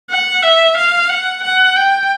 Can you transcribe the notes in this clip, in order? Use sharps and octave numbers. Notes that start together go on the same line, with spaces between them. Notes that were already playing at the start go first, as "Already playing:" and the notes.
F#5
E5
F5
F#5
F#5
G5